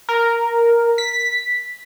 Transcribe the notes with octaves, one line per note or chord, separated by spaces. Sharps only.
A#4
B6